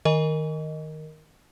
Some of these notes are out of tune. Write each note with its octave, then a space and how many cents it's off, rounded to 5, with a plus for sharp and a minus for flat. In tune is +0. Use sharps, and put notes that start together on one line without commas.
D#3 +0 A#4 +0 D#5 +0